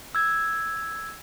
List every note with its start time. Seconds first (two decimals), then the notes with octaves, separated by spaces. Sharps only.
0.15 E6 G#6